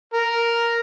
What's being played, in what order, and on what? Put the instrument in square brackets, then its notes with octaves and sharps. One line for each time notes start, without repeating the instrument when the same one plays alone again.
[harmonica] A#4